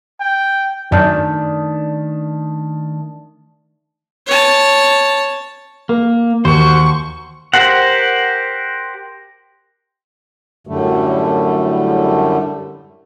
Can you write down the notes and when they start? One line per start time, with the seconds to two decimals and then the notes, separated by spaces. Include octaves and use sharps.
0.20 G5
0.92 F#2 D#3 A3 D4 D5 A5 G6
4.26 C#5 A5
5.89 A#3 A#4
6.45 D#2 F#4 C5 C#6
7.54 G4 A#4 C5 F#5
10.67 F#2 A2 D3 G3 A3